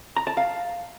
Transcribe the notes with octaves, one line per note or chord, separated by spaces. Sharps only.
A#5
A5
F5